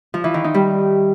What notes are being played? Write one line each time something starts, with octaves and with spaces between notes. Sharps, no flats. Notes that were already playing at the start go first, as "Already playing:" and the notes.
F3
E3
D#3
D#4
G3